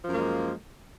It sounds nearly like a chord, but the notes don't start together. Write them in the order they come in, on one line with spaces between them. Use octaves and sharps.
F3 F#2 A#3 G#3